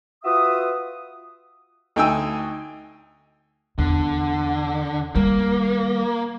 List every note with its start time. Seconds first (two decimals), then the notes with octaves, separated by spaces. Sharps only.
0.25 F4 F#4 B4 E5 D#6
1.96 D2 D#4 G5 G#5 E6
3.78 E2 D3
5.15 D#3 G3 A#3